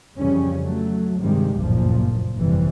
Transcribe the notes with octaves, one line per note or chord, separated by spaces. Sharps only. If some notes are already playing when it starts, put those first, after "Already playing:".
F2 C#3 E3 G3 C#4
F#3 A3
G2 C3 D#3 G3 G#3
F#1 D2 G2 A#2 F3
G1 F2 C3 E3 G3